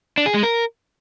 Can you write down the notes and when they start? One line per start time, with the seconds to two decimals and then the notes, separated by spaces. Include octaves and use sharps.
0.18 D4
0.26 G#4
0.34 G#3
0.43 A#4